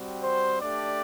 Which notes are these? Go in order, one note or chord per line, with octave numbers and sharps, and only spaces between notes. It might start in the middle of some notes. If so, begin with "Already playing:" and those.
Already playing: G3 C4 F#4
C5
A3 D4 G4 D5